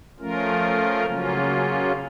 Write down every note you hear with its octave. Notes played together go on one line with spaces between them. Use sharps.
F3 A3 C#4 F4 A#4
C#3 F#3 A#3 C#4 F4